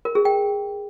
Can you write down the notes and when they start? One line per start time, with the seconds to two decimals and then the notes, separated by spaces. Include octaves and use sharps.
0.05 A#4
0.15 G#4
0.25 G5